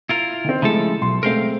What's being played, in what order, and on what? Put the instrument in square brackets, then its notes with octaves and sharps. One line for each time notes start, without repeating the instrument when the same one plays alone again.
[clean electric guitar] E4 F4 A#4
[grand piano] D#3 C4
[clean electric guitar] C#3 F3 A4 [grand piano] G#3 A3 E4
[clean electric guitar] B1 [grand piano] C6
[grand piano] G#3 A3 C4 [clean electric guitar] A#4 C5 F5